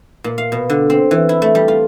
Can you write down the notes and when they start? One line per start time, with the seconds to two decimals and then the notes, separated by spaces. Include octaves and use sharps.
0.24 A#2
0.38 F5
0.52 B2
0.70 D3
0.90 C4
1.11 E3
1.29 E4
1.42 A3
1.55 G3
1.68 F4